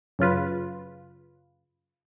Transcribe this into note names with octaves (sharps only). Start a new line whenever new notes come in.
F#2 C#3 F4 B4